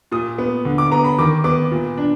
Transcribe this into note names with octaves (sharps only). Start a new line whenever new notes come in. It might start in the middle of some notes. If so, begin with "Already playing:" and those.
A#2 D#6
B3
D3
D6
B3 A#5
B5
D#3 D6
B3 D6
A#2
D4